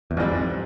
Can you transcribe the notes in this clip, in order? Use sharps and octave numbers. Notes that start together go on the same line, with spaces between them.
E2
F2 G#2 E3 G3 C4
F2